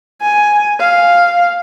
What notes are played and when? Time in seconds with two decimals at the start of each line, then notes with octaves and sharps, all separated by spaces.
0.22 G#5
0.80 F5